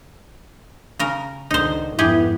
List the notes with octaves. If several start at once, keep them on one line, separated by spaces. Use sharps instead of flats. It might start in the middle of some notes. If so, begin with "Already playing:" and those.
C#3 A#4
C#2 D3 D#3 D#4 C5
F2 G#2 B3 E4 G4 G#4